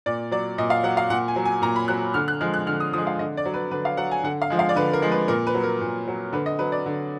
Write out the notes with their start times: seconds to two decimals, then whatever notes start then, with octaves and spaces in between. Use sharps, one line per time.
0.06 A#2 D5
0.31 F#3 D5
0.58 A#2 D#5
0.70 F5
0.83 F#3 F#5
0.97 F5
1.10 A#2 F#5
1.28 G#5
1.36 F#3
1.45 G#5
1.62 A#2 A#5
1.76 B5
1.88 F#3 F#6
2.14 D3 F6
2.28 F#6
2.41 F3 G#3 F6
2.54 F#6
2.66 D3 F6
2.80 D#6
2.93 F3 G#3 D#6
3.07 F5
3.19 D3 D#5
3.37 D5
3.46 F#3
3.54 B4
3.71 D3 B4
3.85 F5
3.97 F#3 F#5
4.11 G#5
4.24 D3 F#5
4.42 F5
4.50 F3 G#3
4.59 F5
4.69 D5
4.76 D3 B4
4.93 A#4
5.02 F3 G#3
5.12 B4
5.28 A#2 A#4
5.47 B4
5.54 F#3
5.63 A#4
5.81 A#2
6.08 F#3
6.33 D3 B4
6.46 D#5
6.59 F#3 B4
6.72 D5
6.86 D3